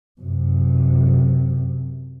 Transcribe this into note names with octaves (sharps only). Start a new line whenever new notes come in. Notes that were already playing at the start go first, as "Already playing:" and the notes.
F#2 C3